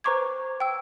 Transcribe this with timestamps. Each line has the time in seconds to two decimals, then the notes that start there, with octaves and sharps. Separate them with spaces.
0.04 B4 C5 A#5 C#6 D6 G#6
0.60 G5 E6